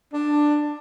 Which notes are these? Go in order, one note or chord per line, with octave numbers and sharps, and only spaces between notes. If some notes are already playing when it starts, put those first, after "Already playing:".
D4